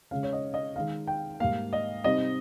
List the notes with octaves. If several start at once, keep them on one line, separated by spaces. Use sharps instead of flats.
C#3 G#3 C#4 F5
C#5
D#5
D#5
D#3 G#3 D#4 F5
G5
G#2 G3 A#3 F5
D#5
C3 G3 C4 D#4 D#5